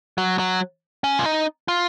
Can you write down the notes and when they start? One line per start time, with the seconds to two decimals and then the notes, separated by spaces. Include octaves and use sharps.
0.18 F#3
0.39 F#3
1.04 C#4
1.19 F4
1.26 D#4
1.68 F4